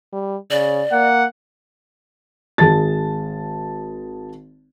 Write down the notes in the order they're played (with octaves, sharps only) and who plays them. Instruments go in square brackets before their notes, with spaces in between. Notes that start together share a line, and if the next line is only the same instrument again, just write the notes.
[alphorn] G3
[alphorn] C#3 [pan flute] D5
[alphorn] A#3 [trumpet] F#5
[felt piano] G#1 G#4 A5 A6